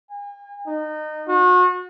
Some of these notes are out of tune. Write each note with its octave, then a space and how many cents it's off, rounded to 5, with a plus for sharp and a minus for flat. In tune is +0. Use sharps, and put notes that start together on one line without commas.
G#5 -40
D#4 -25
F#4 -35